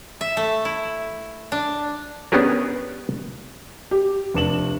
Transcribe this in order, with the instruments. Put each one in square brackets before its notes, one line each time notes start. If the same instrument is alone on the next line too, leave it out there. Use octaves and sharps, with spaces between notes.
[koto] E5
A3
E4
D4
[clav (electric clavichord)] B3 C#4 D4 G4 G#4 A#4
[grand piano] G4
F1 D4 E7 F#7